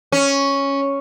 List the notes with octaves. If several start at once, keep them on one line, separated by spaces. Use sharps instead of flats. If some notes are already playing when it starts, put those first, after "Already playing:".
C#4